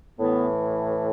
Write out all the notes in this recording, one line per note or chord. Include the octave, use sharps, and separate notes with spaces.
A2 E3 B3